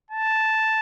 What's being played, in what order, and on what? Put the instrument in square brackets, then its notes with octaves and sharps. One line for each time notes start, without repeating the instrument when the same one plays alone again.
[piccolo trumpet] A5